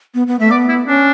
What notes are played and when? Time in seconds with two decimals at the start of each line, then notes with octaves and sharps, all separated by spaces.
0.14 B3
0.27 B3
0.39 A3 E5
0.51 B3 D5
0.69 E4
0.87 C#4 D4